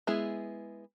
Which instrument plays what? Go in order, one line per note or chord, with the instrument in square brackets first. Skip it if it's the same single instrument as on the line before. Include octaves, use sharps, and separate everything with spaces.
[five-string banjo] G#3 B3 E4 G#4